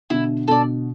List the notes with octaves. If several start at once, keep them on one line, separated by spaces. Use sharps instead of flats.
B2 D3 E4
B2 D3 A4 D5